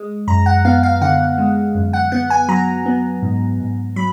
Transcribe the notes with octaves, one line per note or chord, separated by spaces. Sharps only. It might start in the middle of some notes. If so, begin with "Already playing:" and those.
Already playing: G#3
F#2 A#5
F#5
B3 F5
F5
D3 F#5
G#3
F#2
F#5
B3 F#5
G#5
F#3 A#5
B3
G#2
G#2
F#3 B5